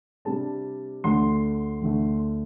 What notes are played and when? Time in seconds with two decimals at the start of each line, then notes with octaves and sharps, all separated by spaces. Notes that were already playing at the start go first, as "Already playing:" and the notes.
0.25 C3 G3 D4 A5
1.04 D2 D3 A3 C6
1.82 D2 D3 A3